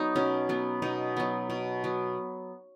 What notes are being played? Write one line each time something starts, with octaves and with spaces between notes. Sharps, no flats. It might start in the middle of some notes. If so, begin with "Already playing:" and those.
Already playing: F#3 B3 D#4
B2 C#4
F#3 B3
B2 D#4
F#3 B3
B2
F#3 B3